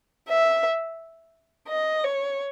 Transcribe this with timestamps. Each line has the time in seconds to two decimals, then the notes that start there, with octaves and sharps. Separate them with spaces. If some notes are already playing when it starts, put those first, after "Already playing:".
0.29 E5
1.68 D#5
2.04 C#5